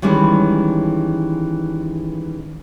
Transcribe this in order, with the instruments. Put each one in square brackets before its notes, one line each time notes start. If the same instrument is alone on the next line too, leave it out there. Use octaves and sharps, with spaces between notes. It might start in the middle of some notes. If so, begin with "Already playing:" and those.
[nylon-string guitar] D#3 E3 G3 G#3 C#4